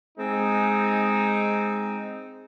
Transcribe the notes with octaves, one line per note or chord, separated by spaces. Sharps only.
G#3 C4 D#4